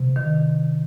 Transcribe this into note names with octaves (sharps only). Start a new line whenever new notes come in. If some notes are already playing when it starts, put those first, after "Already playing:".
Already playing: C3
D#3